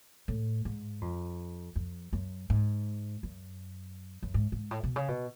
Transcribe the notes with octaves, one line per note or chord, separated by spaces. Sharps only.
A2
G#2
F2
F2
F#2
G#2
F#2
F#2
G#2
G#2
A2
B2
C#3
B2